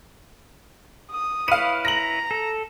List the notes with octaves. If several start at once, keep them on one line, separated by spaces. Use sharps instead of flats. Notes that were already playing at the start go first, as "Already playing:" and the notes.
D#6
E4 B4 C#5 F5 D#7
A#5 A#6 F#7
A4